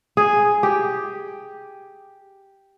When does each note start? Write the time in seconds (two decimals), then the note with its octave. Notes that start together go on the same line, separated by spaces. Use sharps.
0.17 G#4
0.63 G4